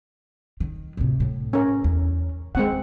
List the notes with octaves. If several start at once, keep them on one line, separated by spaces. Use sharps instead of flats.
D#3
A2 C3
A2
C#4 A#4
E2
D#3 G#3 C4 F#5